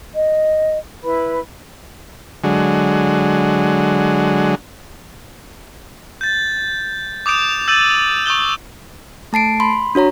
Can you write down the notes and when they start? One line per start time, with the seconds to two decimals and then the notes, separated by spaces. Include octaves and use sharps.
0.17 D#5
1.03 E4 B4 B5
2.44 D3 F#3 G#3
6.21 G6 A6
7.26 D6 D#6 G6 D7 F7
7.68 E6 G6 A6 D#7 F#7
8.26 C#6 D#6 G6 G7
9.33 A3 A5 C7 D7
9.60 B5 C6
9.95 D4 F#4 C#5 A#5